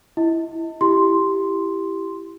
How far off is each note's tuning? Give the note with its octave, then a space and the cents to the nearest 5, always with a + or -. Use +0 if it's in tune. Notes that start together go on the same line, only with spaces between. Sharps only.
E4 +10 D#5 +35
E4 +15 G4 +0 C6 +0